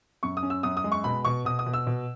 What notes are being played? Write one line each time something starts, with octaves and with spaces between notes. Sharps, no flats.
F#2 C#6
D#6
C#4
E6
F#2 D#6
D#6
G#3
C#6
B2 B5
B2 C#6
B2 D#6
D#6
B2
E6
B2